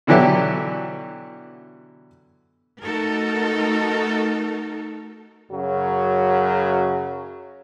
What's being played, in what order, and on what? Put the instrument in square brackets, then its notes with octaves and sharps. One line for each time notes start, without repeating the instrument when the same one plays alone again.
[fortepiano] B2 D3 E3 F#3 E4 G4
[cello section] A3 D#4 F#4 A4 A#4
[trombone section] F#2 C#3 F#3